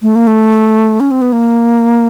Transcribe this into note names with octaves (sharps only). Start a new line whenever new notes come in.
A3
A#3
A3
C#4
C4
B3
A#3